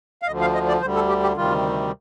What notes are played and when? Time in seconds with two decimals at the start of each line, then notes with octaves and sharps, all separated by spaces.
0.22 F5
0.26 D2 D3 F3 D#5
0.41 F5
0.54 D#5
0.68 D5
0.81 D2 D3 G3 C5
0.95 A4
1.09 G4
1.23 G4
1.37 D2 C3 D#3 G3 F4